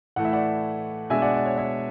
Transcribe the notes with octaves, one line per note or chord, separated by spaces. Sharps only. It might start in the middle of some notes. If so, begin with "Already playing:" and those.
A2 E3 A3 F#5
E5
D5 F#5
B2 G#3 D4 E5 G#5
D5 F#5
D5
C#5
C#5 E5